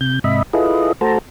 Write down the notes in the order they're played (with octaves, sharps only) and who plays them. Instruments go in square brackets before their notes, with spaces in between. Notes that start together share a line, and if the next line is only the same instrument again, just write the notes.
[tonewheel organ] C3 G6
G#2 C3 D#5 E5 B5
E4 F4 G#4 A4 B4 D#5
A3 F#4 A4 C5 A5 A#5